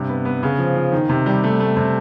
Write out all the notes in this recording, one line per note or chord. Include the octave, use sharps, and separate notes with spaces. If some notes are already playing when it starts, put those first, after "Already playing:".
Already playing: G2 C3
B3
B3
C#3
F3
F3
D#3
C3
G3
A3
A3
C3